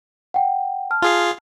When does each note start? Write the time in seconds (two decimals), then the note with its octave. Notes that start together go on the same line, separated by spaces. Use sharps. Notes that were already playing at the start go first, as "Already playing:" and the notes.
0.34 F#5 G5
0.91 A5 F6
1.02 F4 G#4 F5